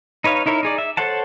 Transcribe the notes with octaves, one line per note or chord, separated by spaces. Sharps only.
D#4 B4 C#5 F5
D#4 E4 A#4 C#5
D#4 G#4 D5
E5
A4 C5 C#5 F#5 A5